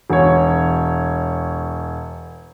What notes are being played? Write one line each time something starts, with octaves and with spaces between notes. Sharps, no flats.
E1 C#5